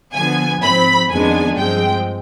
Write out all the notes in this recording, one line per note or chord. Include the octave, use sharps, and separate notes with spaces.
D3 F3 B3 G#5
G#2 F3 C4 B5
F2 D#3 G#3 B3 D4 G#5
G2 F3 G#3 C4 G5